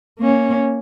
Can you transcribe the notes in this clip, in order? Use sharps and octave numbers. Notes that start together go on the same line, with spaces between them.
A#3 C#4